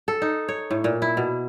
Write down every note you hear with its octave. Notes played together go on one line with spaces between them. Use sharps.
A4
D#4
C#5
A2
A#2
E4
B2